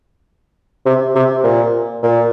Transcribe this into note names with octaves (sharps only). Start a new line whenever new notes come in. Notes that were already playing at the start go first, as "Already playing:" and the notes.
C3
C3
A#2
A#2